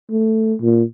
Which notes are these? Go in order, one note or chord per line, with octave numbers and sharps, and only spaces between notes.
A3
A#2